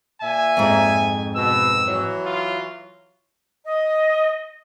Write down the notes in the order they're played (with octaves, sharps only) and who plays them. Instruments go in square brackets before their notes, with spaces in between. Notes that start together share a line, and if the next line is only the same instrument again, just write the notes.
[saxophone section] A#2 E5 [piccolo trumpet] G#5
[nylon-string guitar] F2 G#2
[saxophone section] B2 [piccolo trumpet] E6
[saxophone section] E3 F#3
[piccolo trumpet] F4
[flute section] D#5